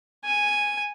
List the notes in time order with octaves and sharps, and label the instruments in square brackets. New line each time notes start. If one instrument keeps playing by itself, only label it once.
[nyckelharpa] G#5